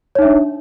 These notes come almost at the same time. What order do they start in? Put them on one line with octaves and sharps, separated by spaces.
C#5 D#4 E5 D4